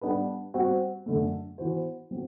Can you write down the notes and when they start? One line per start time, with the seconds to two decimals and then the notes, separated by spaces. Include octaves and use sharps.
0.01 G3 B3 D4 G4 B4
0.54 G3 C4 F#4
1.06 F#2 D3 A3
1.58 E3 B3 F#4 C5
2.11 F#3 C4